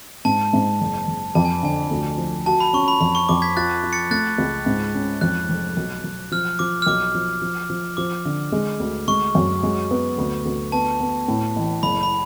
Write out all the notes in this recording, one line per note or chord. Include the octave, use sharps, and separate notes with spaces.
G#2 A5
G#2
F#1
F#1
F2 A5
G#5
D3 G#5
D2
F3
F#4 A5
B5
C#4 C#6
B5
F2 B5
C#6
F2 D6
G#6 B6
F4 F#6 A6
F4
A6 C#7
A3 F#6 A6
C#2
G#2
C#4
F2 F#6
F1
B1
B1
F3 F6
F3 D6
F6
B1 D6
F3
F3
F3
F3 D6
D3
G#3
D2
G#3 C#6
F#2
G#3
B3
D2
D2
B3 A5
B3
A2
A1
F#1 B5
B5